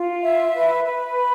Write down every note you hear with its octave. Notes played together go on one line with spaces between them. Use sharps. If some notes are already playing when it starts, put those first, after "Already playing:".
Already playing: F4
E5
B4
B4
B5